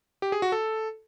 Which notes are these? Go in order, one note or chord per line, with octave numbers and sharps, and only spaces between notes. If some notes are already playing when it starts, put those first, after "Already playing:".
G4
G#4
F#4
A4